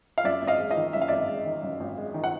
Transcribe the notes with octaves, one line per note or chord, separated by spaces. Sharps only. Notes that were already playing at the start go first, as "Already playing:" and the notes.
F5
F#2 D5 E5
G#1
D#5 F5
G#3
D#5 F5
D#3
F#2 E5
F5
G#1 D5 E5
G#3
D#3
F#2
G#1
G#3
D#3
F#5